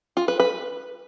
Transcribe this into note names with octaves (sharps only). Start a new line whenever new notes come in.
F4
B4
B4